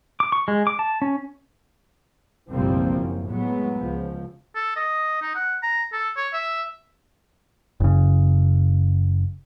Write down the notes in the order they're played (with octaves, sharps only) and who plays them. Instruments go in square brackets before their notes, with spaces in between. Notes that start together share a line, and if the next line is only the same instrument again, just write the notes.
[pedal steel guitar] D6
C#6
G#3
D6
A5
C#4
[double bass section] F#1 B1 F3 G3 A#3 C4
F#2
A2 F#3 G#3 B3
C#2 F3
[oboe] A4
D#5
D#4
F#5
A#5
A4
C#5
E5
[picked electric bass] F#1 C#3